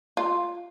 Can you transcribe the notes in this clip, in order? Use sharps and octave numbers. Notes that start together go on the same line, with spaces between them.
F4